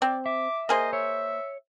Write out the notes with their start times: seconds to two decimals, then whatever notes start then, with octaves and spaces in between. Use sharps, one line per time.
0.02 C4 D5
0.26 E5 D6
0.69 A#3 G#4 C5 D#5
0.93 C#5 E5